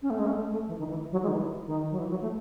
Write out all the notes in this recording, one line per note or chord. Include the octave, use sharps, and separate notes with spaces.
C#4
A3
G#3
C#4
A3
A3
E3
D#3
E3
F#3
G#3
D#3
E3
D#3
F#3
E3
F#3
A3